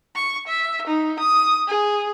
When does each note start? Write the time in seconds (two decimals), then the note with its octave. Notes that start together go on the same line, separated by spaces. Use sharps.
0.16 C#6
0.47 E5
0.87 D#4
1.19 D#6
1.68 G#4